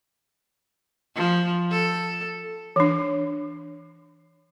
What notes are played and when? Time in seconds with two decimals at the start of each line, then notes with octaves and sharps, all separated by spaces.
1.16 F3
1.71 A4
2.76 E3 D4